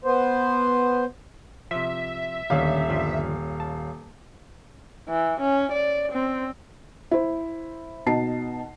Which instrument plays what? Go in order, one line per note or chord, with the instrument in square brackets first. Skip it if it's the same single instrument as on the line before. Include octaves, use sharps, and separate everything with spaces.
[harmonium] B3 C5
[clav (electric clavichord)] C3 F3 [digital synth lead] E5
[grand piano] D#1 C#4 F5 [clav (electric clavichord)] D2 D3 D#3
[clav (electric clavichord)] G1 F3 D4
A5
[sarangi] E3
C#4
D5
C4
[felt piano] E4 C5
B2 D#4 A5 C7